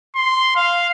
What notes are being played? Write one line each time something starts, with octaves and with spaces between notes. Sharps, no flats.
C6
F5